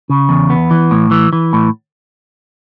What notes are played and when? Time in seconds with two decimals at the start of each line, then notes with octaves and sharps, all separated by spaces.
0.10 C#3
0.29 E2
0.50 B3
0.71 E3
0.91 A2
1.11 E3
1.33 E3
1.53 A2